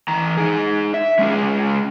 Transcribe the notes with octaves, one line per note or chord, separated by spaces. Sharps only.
E3 A#5
D#4 G#4
E5
G#3 A3 C#4 E4 F4 G#4